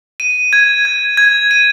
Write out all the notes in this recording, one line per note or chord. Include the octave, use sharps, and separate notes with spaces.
D#7
G#6
G#6
G#6
D#7